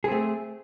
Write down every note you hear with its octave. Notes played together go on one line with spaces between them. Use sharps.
A3 C4 G#4